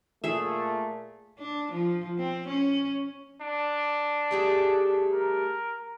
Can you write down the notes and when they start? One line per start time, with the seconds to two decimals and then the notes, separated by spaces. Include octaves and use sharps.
0.24 A#2 A3 G#4 E5
1.38 D4
1.72 F3
2.19 C4
2.48 C#4
3.42 D4
4.31 G3 A3 G#4
5.13 A#4